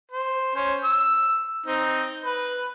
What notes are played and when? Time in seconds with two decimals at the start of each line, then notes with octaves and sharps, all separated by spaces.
0.11 C5
0.56 C#4 C5
0.84 E6
1.66 C4 D#4
2.25 B4